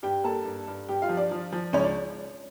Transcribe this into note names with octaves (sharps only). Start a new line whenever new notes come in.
G2 G4 G5
A#3 A4 A5
G2
G2
G2 G4 G5
F4 F5
F3
D4 D5
F3
F3
C#2 C#4 C#5
D4 D5